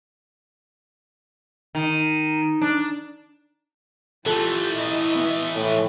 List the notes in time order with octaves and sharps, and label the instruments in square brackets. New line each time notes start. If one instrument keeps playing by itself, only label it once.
[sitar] D#3
D4
[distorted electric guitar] E3 A3 [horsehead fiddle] F4 G4 [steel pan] A4
[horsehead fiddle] E4 D#5
[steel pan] B3
[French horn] A2